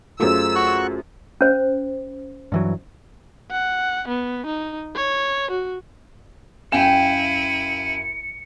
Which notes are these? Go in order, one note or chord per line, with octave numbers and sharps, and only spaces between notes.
F#2 A3 F4 G#4 C5 E6
F#4 C#6 F#6
C#4 C5
G2 E3 F#3
F#5
B3
D#4
C#5
F#4
F#2 E4 F5 G5 G#5 C#7 D#7 E7